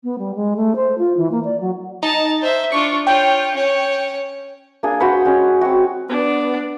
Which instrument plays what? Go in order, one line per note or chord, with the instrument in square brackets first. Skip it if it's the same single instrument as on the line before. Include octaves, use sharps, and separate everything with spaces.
[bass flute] B3
G3
G#3
A3
C5
F4
E3
A#3
D5
F#3
[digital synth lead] D#4 [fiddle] A5 A#5
[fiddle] C5 E5
[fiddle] D4 F4 [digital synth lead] C#6
[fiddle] F4 C#5 [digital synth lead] G5
[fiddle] C#4 C#5
[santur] A#3 D4 G#4
F#4 C5 F#5 B5
G#3 C#4 F#5
C4 F#4
[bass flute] B3 [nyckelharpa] D4